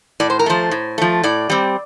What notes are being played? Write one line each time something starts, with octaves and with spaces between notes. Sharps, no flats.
A2 D5
C5
A#4
F3 A3 C5
A2
F3 A3
A2 D5
G3 C4